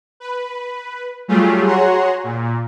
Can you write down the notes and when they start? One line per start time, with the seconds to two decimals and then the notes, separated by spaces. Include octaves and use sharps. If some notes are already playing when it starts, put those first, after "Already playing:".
0.20 B4
1.28 F#3 G3 A3 F4 G4 G#4
1.65 F#4 G#4 C#5 F#5 A#5 C6
2.24 A#2